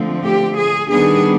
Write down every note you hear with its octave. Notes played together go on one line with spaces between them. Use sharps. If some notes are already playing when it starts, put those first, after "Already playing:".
Already playing: D3 F3 A3 C4
G4
G#4
D#3 G3 B3 D4 G#4